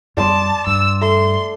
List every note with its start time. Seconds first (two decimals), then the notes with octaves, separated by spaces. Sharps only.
0.17 F#2 G3 D5 A5 C6 D#6
0.67 G2 E6
1.01 A3 C6